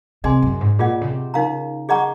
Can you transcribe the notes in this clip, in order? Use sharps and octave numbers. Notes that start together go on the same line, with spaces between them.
C3 G#4 D#5 G#5 C6
F#2
G#2
A#2 F4 G#4 D#5 F#5
C#3
C3
C#3 D#4 A#4 F5 A#5
G#4 D#5 F#5 A#5 C#6